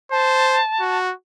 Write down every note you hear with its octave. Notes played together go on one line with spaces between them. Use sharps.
C5 A5
F#4